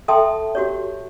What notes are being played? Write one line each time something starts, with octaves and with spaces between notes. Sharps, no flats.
A4 E5 G5 A5 C6 D#6
F#4 G4 C#5